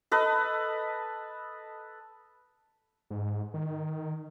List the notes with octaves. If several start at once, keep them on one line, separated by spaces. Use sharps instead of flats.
A4 B4 D#5
G#2
D#3